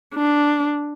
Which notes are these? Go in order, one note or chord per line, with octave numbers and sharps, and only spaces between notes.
D4